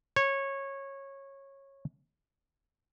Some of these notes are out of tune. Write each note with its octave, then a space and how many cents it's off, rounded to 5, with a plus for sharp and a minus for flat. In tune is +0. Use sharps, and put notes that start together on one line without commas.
C#5 -15